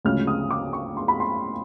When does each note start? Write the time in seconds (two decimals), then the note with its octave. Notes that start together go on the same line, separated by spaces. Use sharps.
0.05 D2 C#3 F3 G#3 C#4 F6
0.27 D#6
0.51 D6
0.73 C#6
0.97 C6
1.08 B5
1.20 C6